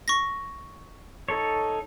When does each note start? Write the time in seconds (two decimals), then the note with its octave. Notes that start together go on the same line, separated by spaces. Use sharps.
0.08 C#6 A#6
1.29 D#4 A4 C#5